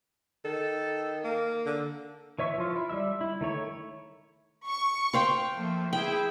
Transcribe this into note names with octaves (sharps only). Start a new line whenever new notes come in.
D#3 A4
A#3
D3
E3 C#5 E5 C#6
F3 F4
E4
G3 E5 E6
E4
D#3 A3 C#5
C#6
C5 F5 G5
F3 A3 A#3
E4 G#4 B4 G5